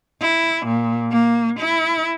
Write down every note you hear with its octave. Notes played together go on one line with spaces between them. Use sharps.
E4
A#2
A#3
E4